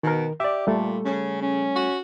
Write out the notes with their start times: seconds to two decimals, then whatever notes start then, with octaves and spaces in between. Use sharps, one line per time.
0.03 B2 D#3 A#4
0.40 G4 D5 E5
0.67 A#2 G3 A3 A4
1.05 C#3 C#4
1.42 C#4
1.76 F#4